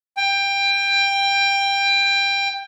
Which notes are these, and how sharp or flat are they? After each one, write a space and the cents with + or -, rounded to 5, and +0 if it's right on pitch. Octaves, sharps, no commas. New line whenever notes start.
G5 +20